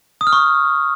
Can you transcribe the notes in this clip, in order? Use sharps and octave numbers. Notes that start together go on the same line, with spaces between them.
D#6
F6
C#6